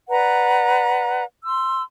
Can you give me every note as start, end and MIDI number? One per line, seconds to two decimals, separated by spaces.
0.10 1.24 71
0.10 1.24 74
0.10 1.24 78
0.10 1.24 82
1.45 1.83 84
1.45 1.83 88